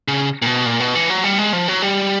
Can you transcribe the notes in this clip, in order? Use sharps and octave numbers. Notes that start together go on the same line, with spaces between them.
C#3
A#2
B2
A#2
B2
E3
F#3
G3
G#3
F3
F#3
G3